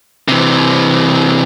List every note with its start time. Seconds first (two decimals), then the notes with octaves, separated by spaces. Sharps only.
0.28 C3 E3